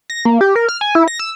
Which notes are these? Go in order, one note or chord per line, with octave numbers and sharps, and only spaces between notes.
A#6
A#3
G4
A#4
F6
G#5
E4
A#6
E6